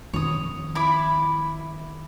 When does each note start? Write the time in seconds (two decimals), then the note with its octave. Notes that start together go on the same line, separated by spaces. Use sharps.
0.14 F2 D#3 C#5 D#6
0.75 E4 B5 D6